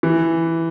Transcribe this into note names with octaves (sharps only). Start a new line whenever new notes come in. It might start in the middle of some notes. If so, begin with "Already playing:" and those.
E3